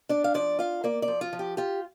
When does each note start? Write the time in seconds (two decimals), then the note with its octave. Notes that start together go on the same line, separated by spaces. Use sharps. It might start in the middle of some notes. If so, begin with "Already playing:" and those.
0.09 D4 D5
0.24 F5
0.34 F3 D5
0.59 F4 F5
0.84 A#3 D5
1.02 D5
1.08 F3
1.21 F4
1.33 F3
1.39 G4
1.57 F4 G4